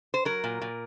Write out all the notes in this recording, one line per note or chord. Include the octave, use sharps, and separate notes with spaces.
C5
F#3 A#4
A#2
A#2